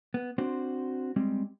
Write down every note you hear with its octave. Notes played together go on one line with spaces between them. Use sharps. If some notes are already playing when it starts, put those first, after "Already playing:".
B3
C4 D4 F#4 C5
G3 G#3 C4